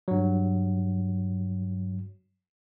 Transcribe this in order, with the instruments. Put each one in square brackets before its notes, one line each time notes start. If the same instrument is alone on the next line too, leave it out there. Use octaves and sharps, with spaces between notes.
[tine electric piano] G2 F#3